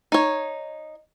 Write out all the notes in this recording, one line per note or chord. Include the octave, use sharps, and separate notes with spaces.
D#4 C#5